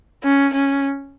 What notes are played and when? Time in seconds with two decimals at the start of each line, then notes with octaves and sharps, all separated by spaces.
0.23 C#4
0.53 C#4